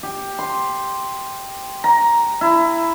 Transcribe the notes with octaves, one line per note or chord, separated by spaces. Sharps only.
G4
C6
A#5
E4